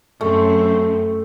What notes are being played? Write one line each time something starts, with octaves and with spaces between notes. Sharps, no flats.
F#2 A3 C4